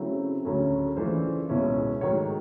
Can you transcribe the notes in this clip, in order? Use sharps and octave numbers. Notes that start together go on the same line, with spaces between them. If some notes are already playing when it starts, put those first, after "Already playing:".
Already playing: C#3 F#3 A3 C4 E4
D2 C#3 F#3 A3 C#4
C#3 E3 A3 D4 F4 C5
C#2 B2 G#3 C#4 E4
G#2 D#3 F#3 A3 C#5